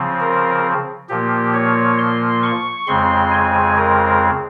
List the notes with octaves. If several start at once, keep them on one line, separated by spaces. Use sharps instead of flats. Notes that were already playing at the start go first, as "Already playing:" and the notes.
Already playing: C#3 F3 C4
A#4
A#2 F3 A#3 G4
C#5
C6
C#6
F2 C#3 G#3 C4 C6
G#5
A#4